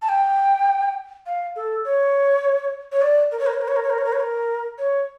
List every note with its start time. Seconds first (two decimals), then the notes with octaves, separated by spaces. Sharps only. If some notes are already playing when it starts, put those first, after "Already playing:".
0.02 A5
0.09 G5
1.26 F5
1.56 A4
1.85 C#5
2.92 C#5
3.02 D5
3.32 A#4
3.39 C#5
3.47 A#4
3.53 C#5
3.61 A#4
3.68 C#5
3.76 A#4
3.83 C#5
3.90 A#4
3.98 C#5
4.05 A#4
4.13 C#5
4.20 A#4
4.78 C#5